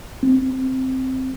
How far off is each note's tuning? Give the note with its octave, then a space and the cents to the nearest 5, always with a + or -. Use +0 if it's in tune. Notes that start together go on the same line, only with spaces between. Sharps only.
C4 -5